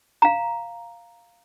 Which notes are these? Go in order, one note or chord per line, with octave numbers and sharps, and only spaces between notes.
F5 A#5